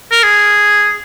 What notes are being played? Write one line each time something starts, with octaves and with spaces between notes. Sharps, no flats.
A#4
G#4